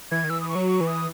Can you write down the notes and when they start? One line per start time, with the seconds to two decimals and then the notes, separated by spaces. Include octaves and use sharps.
0.11 E3 G#6
0.24 D#3
0.30 E3 E6
0.41 D#6
0.49 C#6
0.55 F#3
0.68 C#6
0.81 E3
0.87 D#6